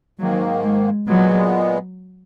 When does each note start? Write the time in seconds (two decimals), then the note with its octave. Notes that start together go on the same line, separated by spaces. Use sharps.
0.19 G#2 D#3 F#3 A#3
0.64 G#3
1.07 A#2 F#3 G#3 B3